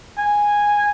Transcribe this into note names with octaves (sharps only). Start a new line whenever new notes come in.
G#5